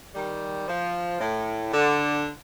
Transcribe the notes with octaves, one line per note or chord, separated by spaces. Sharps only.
D#3 G3
F3
A2
D3